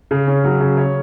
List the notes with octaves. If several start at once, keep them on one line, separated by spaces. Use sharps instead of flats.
C#3
C#4
F#3
C#3
C#5